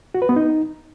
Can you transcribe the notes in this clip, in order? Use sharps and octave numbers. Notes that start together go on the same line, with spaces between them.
F#4
B4
B3
D#4